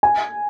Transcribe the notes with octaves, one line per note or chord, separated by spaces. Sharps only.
G#5